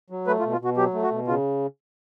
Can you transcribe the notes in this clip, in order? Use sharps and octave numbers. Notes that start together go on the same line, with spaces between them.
F#3
A3 B4
F4
B2
F4
B2 F#4
F#3 G4
A3
F#4
B2
C#3 F4